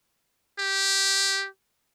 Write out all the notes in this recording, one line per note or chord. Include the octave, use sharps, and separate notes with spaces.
G4